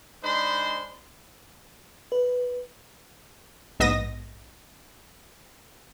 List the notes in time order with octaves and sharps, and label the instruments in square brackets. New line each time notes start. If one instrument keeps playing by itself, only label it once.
[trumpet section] G#3 D4 D#4 C5 B5 C6
[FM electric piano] B4
[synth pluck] A#1 G#2 B3 D#5 D#6 A#6